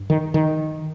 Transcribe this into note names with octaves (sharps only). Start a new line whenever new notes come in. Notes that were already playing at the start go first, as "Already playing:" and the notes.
Already playing: G2
D#3
D#3